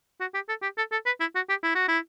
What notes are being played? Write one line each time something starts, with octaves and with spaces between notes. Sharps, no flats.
F#4
G4
A4
G4
A4
A4
B4
E4
F#4
G4
E4
F#4
E4